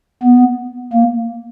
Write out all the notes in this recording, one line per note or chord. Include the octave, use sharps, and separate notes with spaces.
B3
A#3